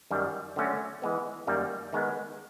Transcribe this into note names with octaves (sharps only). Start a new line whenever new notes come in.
F#2 D#3 G3
D3 F#3 A3 C#4 F#4
E3 G#3 B3
F#2 D#3 G3 A#3
D#3 G#3 B3